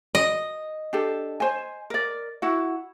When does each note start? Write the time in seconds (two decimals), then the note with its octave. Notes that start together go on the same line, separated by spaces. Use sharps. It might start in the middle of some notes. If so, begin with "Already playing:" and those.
0.15 D#5
0.93 D4 G4 A4
1.40 C5 G#5
1.90 A#4 D5
2.42 E4 F#4 F#5